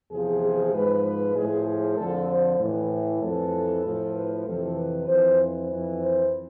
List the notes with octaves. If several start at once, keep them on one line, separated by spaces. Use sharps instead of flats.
E2 C3 F3 G#4
G#2 F3 B4
B4
A2 F3 G#4
G#4
F2 D3 F3 A4
C5
A2 E3
F2 E3 A4
A2 F3
B4
F2 C3 E3 A4
B4
F2 E3 C5
F2 E3
C5